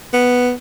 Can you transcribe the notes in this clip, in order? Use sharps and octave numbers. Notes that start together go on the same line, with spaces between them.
B3